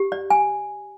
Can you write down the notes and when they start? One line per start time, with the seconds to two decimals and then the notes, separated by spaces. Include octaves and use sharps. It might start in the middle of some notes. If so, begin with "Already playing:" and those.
Already playing: G4
0.12 D5
0.30 G#5